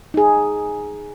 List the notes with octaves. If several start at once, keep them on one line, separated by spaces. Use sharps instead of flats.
D#4 G#4